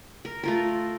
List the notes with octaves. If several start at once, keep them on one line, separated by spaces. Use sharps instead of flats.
A#4
A3 F4 A#4